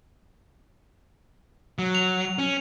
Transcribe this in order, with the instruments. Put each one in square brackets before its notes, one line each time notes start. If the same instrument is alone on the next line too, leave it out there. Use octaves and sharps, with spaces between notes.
[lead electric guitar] F#3
[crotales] F7
[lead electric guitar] C#4